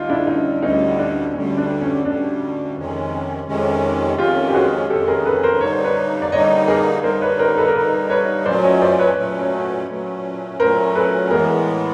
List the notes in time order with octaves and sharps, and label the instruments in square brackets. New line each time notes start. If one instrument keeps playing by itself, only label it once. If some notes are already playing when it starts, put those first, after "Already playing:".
Already playing: [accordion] D2 D3 G3 [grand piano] D#4 F4
[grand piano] D4 E4
C#4 D#4
[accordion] D2 D3 G3 [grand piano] C#4 D#4
[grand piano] D4
[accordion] D2 D3 G3 [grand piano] C#4
[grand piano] D4
C#4
[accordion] D2 D3 G3 [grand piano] D4
[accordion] F2 C3 D#3 G#3 C#4
F2 C3 D#3 G#3 C#4
[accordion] F2 C3 D#3 G#3 C#4 [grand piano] F4 G4
[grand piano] G4
F#4 G#4
[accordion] F2 C3 D#3 G#3 C#4 [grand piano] G4 A4
[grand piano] G#4 A#4
A4 B4
A#4 C5
[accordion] D3 G3 A#3 D#4 [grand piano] C#5
[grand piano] C5
B4 C#5
D5
[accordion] D3 G3 A#3 D#4 [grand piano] C#5 D#5
[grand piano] G#4 A#4
[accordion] D3 G3 A#3 D#4 [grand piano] A#4 C5
[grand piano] B4 C#5
A#4 C5
A4 B4
A#4
[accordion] D3 G3 A#3 D#4 [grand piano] A4 B4
[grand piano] B4 C#5
[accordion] A#2 F#3 A3 C#4 [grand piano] C5 D5
[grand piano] C#5 D#5
C5 D5
B4 C#5
[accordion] A#2 F#3 A3 C#4
A#2 F#3 A3 C#4
[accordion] A#2 F#3 A3 C#4 [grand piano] A#4 C5
[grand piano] A4 B4
[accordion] A2 E3 G#3 B3 [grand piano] G#4 A#4